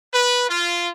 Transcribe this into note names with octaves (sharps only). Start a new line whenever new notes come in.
B4
F4